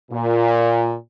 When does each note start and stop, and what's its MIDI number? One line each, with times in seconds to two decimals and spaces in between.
0.12 0.94 46